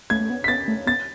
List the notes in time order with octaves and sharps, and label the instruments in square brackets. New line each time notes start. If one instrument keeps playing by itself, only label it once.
[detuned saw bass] A3 [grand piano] G#6
[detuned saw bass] A3
B3
[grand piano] B6
[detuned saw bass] B3 [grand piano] A6
[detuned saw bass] A3
[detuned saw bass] B3 [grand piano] A6